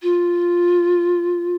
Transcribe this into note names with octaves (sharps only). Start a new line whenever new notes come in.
F4